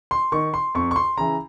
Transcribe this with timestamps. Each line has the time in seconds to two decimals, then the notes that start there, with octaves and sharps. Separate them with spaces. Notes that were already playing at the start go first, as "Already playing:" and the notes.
0.11 C6
0.32 D#3 C#6
0.54 C6
0.75 F2 C#6
0.91 C#6
0.96 C6
1.17 C#3 E3 A#5